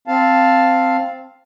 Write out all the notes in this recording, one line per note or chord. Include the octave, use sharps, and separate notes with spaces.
C4 F5 A5